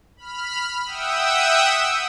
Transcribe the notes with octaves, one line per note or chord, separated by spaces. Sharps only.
B5 F6
E5 F#5 G5 D#6 E6